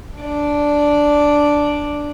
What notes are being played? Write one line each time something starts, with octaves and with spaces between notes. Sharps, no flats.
D4 D5